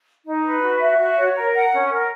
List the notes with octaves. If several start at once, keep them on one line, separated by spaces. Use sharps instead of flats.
D#4
B4
F#4
E5
F#4
C#5
A#4
F#5
C#4
A#4